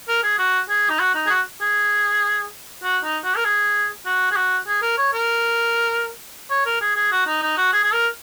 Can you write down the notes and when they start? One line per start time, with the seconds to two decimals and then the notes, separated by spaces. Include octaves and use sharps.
0.08 A#4
0.23 G#4
0.39 F#4
0.69 G#4
0.90 D#4
1.00 F#4
1.15 D#4
1.26 G#4
1.30 F#4
1.61 G#4
2.83 F#4
3.03 D#4
3.24 F#4
3.36 A#4
3.45 G#4
4.06 F#4
4.31 G#4
4.36 F#4
4.67 G#4
4.82 A#4
4.98 C#5
5.13 A#4
6.50 C#5
6.66 A#4
6.81 G#4
6.96 G#4
7.12 F#4
7.27 D#4
7.42 D#4
7.57 F#4
7.73 G#4
7.84 G#4
7.93 A#4